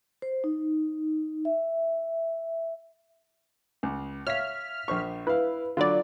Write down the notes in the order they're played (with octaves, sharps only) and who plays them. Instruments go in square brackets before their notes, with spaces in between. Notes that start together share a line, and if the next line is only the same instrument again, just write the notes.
[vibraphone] C5
D#4
E5
[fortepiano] C#2
[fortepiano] C#5 E5 F5 [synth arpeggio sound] F6 B6
[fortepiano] A#1 C5 C#6
[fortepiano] E4 F5 [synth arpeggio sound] B4
[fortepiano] D3 F#3 B5 [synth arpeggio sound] F4 D5